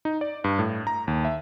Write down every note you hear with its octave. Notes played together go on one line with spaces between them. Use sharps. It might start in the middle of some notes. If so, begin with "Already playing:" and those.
D#4
D5
G2
A2
A#5
D#2
E5